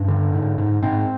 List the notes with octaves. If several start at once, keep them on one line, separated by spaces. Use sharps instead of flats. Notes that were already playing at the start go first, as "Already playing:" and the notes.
Already playing: G2 C#4
D3
G#2
G#2
G#2 C4